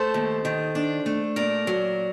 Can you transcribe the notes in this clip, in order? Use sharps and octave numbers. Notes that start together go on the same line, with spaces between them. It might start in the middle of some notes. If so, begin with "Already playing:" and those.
Already playing: A3 A4 C5
D#2
D#3
D4
A3
A#2 A#4 D5
F#3